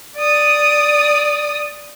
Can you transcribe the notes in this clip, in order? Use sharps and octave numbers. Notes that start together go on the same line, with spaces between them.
D5 D#6